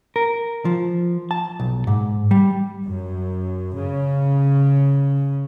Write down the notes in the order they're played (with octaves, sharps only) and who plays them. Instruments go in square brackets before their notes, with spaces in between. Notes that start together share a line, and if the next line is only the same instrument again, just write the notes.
[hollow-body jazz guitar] A#4
F3
A5
B1
G#2
G3
[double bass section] F#2
C#3